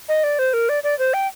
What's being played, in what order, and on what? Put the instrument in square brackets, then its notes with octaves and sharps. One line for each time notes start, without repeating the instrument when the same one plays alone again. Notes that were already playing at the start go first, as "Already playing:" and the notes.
[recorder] D#5
D5
C5
A#4
D5
D5
C5
G5